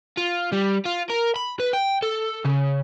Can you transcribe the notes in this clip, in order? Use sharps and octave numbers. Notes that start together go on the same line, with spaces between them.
F4
G3
F4
A#4
B5
B4
G5
A4
C#3